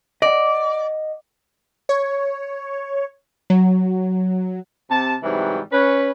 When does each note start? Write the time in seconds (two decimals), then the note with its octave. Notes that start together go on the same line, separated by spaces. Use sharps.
0.22 D5 D#5 F#5
1.89 C#5
3.50 F#3
4.90 C3 A5
5.23 G#2 C3 E3 F#3 G3
5.72 C#4 B4